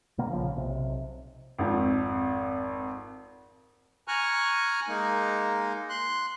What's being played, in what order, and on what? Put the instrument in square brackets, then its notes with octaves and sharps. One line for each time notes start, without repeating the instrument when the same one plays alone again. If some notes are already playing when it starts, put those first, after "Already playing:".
[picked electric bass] B2 D3 A#3
A#1 C#3 F3
B1 C3
[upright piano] G#1 F2
[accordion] G#5 A#5 C#6 F6 F#6
G#3 A#3 D#4
C6 F#6